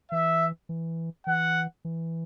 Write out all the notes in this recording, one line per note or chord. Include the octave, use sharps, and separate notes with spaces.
E3 E5
E3
E3 F#5
E3